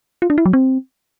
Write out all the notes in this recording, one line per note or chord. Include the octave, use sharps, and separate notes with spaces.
F4
D4
E4
F#3
C4